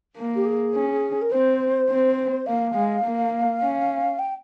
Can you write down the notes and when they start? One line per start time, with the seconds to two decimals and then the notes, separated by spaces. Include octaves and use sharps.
0.17 A#3
0.36 G4
0.45 G#4
0.75 C#4
1.22 A#4
1.32 C4 C5
1.90 C4
2.47 A#3 F5
2.75 G#3
3.04 A#3
3.62 C#4
4.19 G5